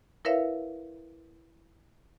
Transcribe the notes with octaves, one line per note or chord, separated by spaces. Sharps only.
E4 A#4 B4 C#5 E5 F5